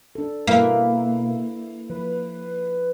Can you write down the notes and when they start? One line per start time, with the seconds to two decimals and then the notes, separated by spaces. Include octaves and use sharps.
0.15 D4 A4
0.47 B2 A#3 E4 B4 E5
1.90 F3 B4